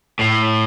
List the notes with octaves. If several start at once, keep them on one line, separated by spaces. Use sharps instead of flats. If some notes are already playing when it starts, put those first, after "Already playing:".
A2